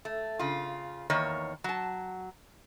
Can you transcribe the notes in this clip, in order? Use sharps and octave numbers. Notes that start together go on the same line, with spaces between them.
A3
C#3 F4
E2 D#3 A#3 C#5
F#3 A5